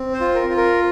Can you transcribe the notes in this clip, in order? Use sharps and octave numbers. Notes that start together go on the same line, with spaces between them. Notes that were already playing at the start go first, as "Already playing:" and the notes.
Already playing: C4
C5
F4
A#4
F4
A#4